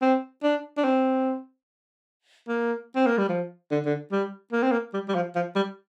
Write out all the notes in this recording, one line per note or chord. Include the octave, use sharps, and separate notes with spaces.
C4
D4
D4
C4
A#3
C4
A#3
G3
F3
D3
D3
G3
A#3
C4
A#3
G3
G3
F3
F3
G3